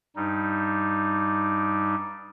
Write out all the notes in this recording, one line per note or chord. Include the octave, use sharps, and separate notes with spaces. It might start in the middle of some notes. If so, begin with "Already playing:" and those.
G2 G3 D#4